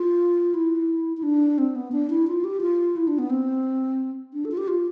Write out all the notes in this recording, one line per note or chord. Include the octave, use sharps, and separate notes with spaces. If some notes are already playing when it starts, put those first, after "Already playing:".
Already playing: F4
E4
E4
D4
C4
B3
D4
E4
F4
G4
F4
E4
D4
B3
C4
D4
A4
F4
G4
F4